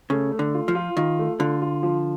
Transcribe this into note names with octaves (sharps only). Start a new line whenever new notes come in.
C#3 A3
A3
D3
F4
F3
F4
D#3 F4
A3
D3 F4
F4
F3